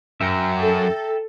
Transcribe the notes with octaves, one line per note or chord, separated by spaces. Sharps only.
F#2 E5 G5 A#5
A4